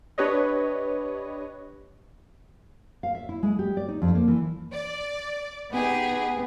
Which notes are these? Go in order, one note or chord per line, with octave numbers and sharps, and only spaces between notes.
D4 G4 B4 C#5 D#5
F5
E5
E4
G#3
G4
D5
D#4
F2
A#3
E3
D5
B3 D#4 G4 G#4